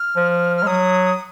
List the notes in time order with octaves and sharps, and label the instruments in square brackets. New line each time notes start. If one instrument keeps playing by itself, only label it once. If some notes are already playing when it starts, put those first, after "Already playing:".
Already playing: [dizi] F6
[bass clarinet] F3
[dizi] F6
[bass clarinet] G#3
[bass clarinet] F#3 [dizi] D#6